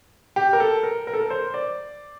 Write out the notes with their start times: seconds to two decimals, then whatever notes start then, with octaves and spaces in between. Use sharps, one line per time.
0.36 G4
0.53 A#4
0.60 A4
0.83 A#4
1.07 A#4
1.13 A4
1.21 A#4
1.30 C5
1.54 D5